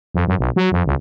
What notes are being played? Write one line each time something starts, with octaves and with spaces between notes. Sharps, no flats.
F2
F#2
B1
F#3
F2
C#2